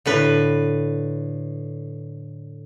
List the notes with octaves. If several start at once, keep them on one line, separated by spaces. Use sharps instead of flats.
A2 D3 B4